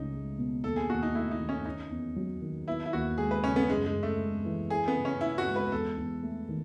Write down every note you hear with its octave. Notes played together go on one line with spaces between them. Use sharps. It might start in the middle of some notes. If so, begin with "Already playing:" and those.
Already playing: C#2 A3 C#4 D#4
G#3
B2
D#2 A4
G#4
D#2 F#4
D#4
A3 E4
D#4
D#3
C#4
C#4 D#4
E2
F#3
D#3
B3 E4
E4
D#2 F#4
G#3 G#4
B4
C#3 C#4
B3
F#2 G#3
G#3
F#2
A3
G#3
E3
E4 G#4
B3
C#3
C#4
C#4 E4
F#4
G#3
B4
E2 A4
E2
A3
D#3